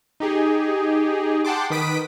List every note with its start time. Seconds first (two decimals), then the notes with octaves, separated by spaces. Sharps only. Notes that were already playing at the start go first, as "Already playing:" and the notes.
0.20 D#4 G4 G#4
1.45 F#5 G5 A5 C6 D6
1.70 D#3 B4 D#6 B6 D7